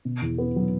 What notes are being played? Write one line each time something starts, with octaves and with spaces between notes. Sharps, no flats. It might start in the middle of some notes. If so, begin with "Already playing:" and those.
B2
E2
B3
F#3